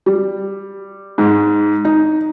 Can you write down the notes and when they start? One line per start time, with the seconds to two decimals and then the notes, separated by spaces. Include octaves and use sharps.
0.06 G3
1.18 G#2
1.85 D#4